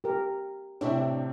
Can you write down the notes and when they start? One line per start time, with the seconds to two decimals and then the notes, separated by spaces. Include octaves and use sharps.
0.04 G4 A#4
0.81 A2 C3 D4 C#5 E5